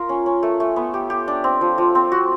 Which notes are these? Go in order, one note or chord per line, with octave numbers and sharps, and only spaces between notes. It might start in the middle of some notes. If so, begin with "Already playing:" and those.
Already playing: F4 A#4
C#4
C#4
A3
A3
B3
G4
G4
D4
C4
F3
F3
C4
F#4